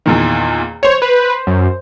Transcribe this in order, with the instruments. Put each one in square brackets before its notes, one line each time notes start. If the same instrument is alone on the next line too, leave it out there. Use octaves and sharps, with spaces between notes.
[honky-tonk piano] E2 A#2 D#3
[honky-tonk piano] C5 F7 [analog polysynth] C#5
[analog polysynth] B4
F#2